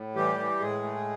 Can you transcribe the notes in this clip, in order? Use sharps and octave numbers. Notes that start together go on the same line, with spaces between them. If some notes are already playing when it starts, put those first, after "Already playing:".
Already playing: A2
E3 G3 G4
E3
A2 G#3 G#4
A3